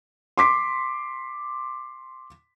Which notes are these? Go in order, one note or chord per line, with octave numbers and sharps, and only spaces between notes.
C6 D6 B6